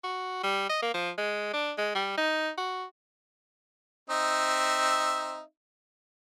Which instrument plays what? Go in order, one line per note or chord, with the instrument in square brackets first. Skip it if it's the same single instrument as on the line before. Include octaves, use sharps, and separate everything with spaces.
[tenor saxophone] F#4
G3
D#5
A#3
F3
G#3
D4
G#3
G3
D#4
F#4
[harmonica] C4 D#4 E5